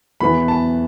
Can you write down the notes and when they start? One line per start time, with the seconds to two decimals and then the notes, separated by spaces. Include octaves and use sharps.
0.20 E2 E3 B3 B5
0.48 A5